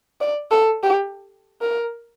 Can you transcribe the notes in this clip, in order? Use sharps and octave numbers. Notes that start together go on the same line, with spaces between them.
D5
A4
G4
A#4